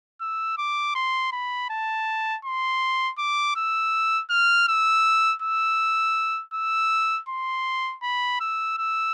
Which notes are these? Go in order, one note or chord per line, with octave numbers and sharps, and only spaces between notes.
E6
D6
C6
B5
A5
C6
D6
E6
F6
E6
E6
E6
C6
B5
E6
E6